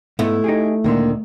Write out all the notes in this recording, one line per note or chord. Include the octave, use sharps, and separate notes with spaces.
G#2 A3 B3 E4
D#4 G4 G#4
D2 A#2 D3 D#3 A#3